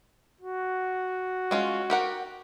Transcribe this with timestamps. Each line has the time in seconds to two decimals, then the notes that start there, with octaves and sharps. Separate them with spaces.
0.41 F#4
1.51 G#3 C#4 F4
1.90 G4 A#4 F#5